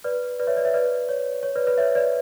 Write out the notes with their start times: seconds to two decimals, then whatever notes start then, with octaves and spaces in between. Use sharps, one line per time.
0.04 B4 D5
0.39 B4 D5
0.47 C#5 E5
0.56 B4 D5
0.65 C#5 E5
0.74 B4 D5
1.09 C#5
1.43 C#5
1.56 B4 D5
1.67 B4 D5
1.78 C#5 E5
1.95 B4 D5